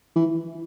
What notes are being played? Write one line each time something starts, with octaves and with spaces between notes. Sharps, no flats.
E3